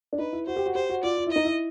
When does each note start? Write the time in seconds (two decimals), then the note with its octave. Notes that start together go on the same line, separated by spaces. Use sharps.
0.13 D4
0.19 D#4 B4
0.33 E4
0.47 F#4 C5
0.56 G4
0.66 F#4
0.75 G4 C5
0.90 F#4
1.03 F4 D5
1.18 F4
1.27 E4
1.31 D#4 D#5
1.45 E4